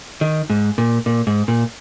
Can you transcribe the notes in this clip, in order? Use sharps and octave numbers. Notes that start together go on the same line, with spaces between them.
D#3
G#2
A#2
A#2
G#2
A#2